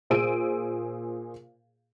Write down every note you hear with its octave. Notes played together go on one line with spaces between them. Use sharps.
A#2 G#4 C5 E6 D7 D#7